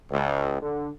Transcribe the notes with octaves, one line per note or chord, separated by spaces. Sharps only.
C#2
D3